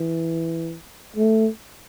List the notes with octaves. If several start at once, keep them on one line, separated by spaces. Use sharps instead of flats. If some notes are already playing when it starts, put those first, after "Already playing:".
Already playing: E3
A3